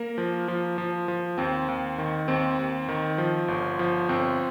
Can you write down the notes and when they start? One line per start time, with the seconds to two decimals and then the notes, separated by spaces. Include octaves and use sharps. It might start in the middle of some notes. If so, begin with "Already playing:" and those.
Already playing: A#3 A#4
0.18 F3
0.48 F3
0.78 F3
1.08 F3
1.38 D#2 C4
1.68 D#2
1.98 D#3
2.28 D#2 C4
2.59 D#2
2.89 D#3
3.18 F3
3.48 G1
3.79 F3
4.09 G1 C4